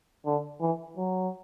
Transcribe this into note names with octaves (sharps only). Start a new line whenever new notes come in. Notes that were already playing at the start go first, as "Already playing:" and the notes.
D3
E3
F#3